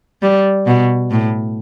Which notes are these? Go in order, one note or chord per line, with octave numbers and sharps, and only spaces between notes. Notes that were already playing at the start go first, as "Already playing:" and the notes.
G3
B2
A2